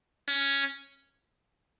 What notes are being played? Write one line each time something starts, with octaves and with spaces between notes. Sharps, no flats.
C#4